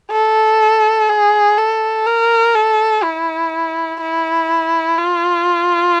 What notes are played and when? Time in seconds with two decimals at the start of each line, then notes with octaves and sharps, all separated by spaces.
0.11 A4
1.09 G#4
1.58 A4
2.07 A#4
2.55 A4
3.03 E4
4.01 E4
4.98 F4